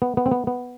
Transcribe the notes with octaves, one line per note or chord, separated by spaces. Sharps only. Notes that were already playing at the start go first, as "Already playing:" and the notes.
B3
B3
C4
B3
B3